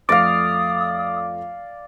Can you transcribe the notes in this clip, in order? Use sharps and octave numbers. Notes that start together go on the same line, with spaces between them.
F2 A3 D5 F5 D6 D#6 A#6